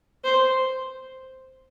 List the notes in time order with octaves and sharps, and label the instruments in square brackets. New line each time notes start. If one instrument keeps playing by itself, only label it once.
[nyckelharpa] C5